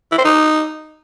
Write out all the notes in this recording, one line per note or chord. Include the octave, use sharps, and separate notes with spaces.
E4
C5
D#4